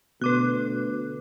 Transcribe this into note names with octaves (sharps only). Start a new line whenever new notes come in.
D2 B2 B4 D6 F#6